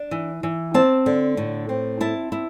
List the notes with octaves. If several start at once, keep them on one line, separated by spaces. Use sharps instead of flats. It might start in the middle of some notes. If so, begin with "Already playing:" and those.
Already playing: D4
E3
E3
C4 A5
D3
A2
C4
E4 A5
E4